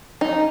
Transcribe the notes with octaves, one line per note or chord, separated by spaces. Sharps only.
D#4